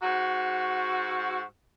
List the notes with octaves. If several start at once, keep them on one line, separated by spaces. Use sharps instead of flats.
G#2 F#4